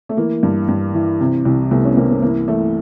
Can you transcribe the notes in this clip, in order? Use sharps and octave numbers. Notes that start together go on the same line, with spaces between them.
A3
E3 A#3
G2
G2
E3
C3
C2
C2 A3 B3
B3 C#4
C2 A#3 C4
A#3
E3 A#3
E3 A3